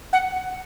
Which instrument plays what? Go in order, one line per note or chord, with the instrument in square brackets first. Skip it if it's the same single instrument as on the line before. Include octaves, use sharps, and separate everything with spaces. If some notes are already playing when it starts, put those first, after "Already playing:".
[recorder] F#5